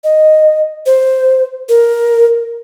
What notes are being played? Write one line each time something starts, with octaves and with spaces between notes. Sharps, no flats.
D#5
C5
A#4